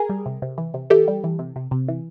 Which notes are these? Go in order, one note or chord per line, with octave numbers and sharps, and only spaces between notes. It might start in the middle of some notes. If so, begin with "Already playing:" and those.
Already playing: G#4 A#4
G3
C3
C3
E3
C3
E3 G4 A4
G3
E3
C3
C3
C3
E3